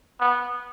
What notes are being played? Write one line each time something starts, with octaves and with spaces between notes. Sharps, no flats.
B3